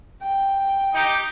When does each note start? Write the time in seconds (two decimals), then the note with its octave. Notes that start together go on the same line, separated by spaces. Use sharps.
0.23 G5
0.94 D#4 G4